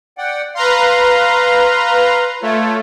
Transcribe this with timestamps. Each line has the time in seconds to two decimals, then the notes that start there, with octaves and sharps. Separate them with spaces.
0.18 D5 F#5 G5
0.55 B4 F5 A#5 C6
2.42 A3 F4 C#5